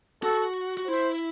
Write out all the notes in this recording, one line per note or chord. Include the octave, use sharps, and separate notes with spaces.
F#4 A4
F#4
E4 C5